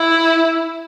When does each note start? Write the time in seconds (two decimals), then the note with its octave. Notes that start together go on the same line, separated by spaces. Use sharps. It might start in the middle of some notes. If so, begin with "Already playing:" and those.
Already playing: E4